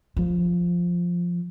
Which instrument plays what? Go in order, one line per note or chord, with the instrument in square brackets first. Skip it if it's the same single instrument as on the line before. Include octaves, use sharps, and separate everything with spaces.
[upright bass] F3